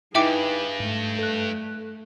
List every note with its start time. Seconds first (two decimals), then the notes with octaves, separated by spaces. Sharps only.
0.15 G2 D#4 E4 G#4 B4 E5 G5 D6
0.80 G#2 A3
1.19 A4 F#6